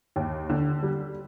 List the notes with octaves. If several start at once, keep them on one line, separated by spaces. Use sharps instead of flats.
D#2
D3
G3